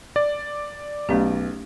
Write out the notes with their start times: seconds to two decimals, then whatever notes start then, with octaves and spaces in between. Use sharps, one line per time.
0.16 D5
1.09 B1 A3 C#4 G4